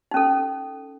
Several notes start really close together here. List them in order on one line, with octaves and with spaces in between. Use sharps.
D#4 C#4 A4